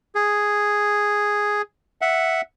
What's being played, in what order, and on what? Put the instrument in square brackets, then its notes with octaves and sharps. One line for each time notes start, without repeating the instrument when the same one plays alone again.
[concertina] G#4
E5 F#5